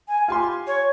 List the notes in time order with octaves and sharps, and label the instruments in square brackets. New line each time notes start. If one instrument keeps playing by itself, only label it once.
[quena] G#5
[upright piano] F4 G#5 C6 [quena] G4
[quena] C#5